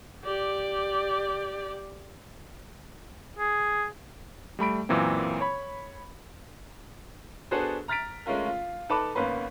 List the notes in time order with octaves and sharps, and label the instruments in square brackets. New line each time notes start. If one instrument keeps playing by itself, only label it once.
[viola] G4 D5
[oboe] G#4
[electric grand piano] G3 A3 B5 D7
F#2 A#2 E3 F#3 A#3 C4
C#5 B5
[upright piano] B3 D4 F#4 G#4 A4 C5
A#5 F6 A6 B6 D7
G#3 A3 C#4 F4 A#4
F4
D#4 A4 B4 A5 B5 D6
G#1 A#3 B3 C#4 B4 C6